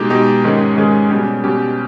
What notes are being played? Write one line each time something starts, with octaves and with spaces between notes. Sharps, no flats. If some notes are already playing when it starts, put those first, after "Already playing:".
Already playing: B2 G#3 D#4 G4
B2 G#3 D#4 G4
G#2 D#3 G#3 C#4 G#4
G#2 D#3 G#3 C#4 G#4
B2 G3 C#4 G4
B2 G3 C#4 G4